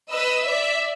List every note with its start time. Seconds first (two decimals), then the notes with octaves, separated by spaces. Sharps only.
0.10 B4 D#5 E6
0.44 D5 E5